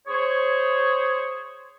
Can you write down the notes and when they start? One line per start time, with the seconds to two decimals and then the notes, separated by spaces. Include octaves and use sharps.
0.08 G#4 C5 C#5